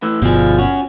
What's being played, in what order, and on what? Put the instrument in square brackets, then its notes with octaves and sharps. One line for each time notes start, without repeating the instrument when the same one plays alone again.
[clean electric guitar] A2 E3
[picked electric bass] G1 B2 [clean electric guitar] F3 G#4
[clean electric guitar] C#4 F#4